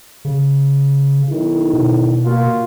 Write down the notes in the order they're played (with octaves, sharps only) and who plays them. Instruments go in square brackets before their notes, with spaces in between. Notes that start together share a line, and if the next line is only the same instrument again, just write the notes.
[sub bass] C#3
[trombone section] B1 D#3 E4
[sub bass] B2
[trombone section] A#3 F4 F#4